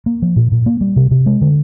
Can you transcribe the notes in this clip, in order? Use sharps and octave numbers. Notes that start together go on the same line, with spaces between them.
A#3
F3
A#2
A#2
A#3
G3
C3
C3
G#3
D3